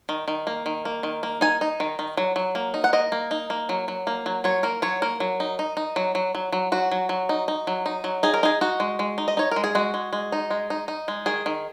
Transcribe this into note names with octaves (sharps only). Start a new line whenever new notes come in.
D#3
D#3
A#3
D#3
A#3
D#3
A#3
D#4 G#5
D#4
D#3
D#3
F#3
F#3
A#3
D#4
F#5
A#3 D#5
A#3
D#4
A#3
F#3
F#3
A#3
F#3
F#3 C#5
A#3 A#4
F#3 C#5
A#3 A#4
F#3
D#4
D#4
D#4
F#3
F#3
F#3
F#3
F#3 F#4
F#3
F#3
D#4
D#4
F#3
D#4
F#3
D#4 G#4
A#4
D#4 G#4
D#4 F#4
G#3
G#3
D#4
D#5
D#4 C#5
G#3 A#4
G#4
G#3 F#4
G#3
G#3
D#4
G#3
D#4
D#4
G#3
D#3 G#4
D#3